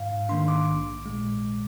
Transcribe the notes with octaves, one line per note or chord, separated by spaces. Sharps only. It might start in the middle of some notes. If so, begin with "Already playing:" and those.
Already playing: G#2 F5
D#3 A#3 D4 C6
D6
A#1
A#2 G#3